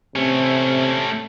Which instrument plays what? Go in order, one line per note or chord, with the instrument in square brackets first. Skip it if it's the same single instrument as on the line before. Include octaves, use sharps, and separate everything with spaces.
[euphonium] C3 [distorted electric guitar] A3 C#4